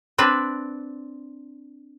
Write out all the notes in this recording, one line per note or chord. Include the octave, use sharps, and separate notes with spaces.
C4 D4 B4